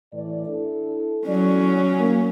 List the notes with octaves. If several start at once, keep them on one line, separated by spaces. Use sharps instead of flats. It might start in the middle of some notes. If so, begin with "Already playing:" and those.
A2 E3 D5
D4 E4 A4
F#3 C#4 E4 A4 D5
A#3